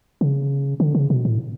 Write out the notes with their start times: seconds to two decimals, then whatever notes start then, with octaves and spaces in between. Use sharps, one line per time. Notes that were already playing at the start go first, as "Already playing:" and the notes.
0.21 C#3
0.80 D3
0.95 C#3
1.10 B2
1.25 A2